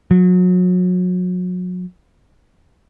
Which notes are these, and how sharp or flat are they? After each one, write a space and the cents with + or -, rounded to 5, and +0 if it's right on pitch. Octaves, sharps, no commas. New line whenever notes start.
F#3 -35